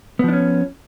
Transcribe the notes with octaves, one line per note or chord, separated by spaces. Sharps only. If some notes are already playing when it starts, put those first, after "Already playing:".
F3 B3 C#4 D4